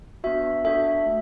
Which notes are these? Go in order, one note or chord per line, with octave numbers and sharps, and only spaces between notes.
B3 D4 F#4 E5
D4 F#4 A4 E5
A3